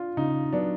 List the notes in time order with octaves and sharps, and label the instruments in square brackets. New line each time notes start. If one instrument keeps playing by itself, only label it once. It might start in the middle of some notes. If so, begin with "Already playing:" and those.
Already playing: [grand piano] D4 F4
[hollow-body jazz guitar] C#3 [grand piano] D#4
[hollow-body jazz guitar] F#3 B3 [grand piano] D4